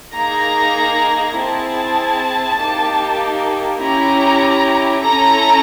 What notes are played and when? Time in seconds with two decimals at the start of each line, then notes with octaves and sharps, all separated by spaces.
0.16 A#3 D#4 G#4 A#5
1.39 C4 E4 G#4 A5
2.60 A#3 D#4 G4
3.82 C#4 E4 G4 A#5
5.05 C#4 E4 A4 A#5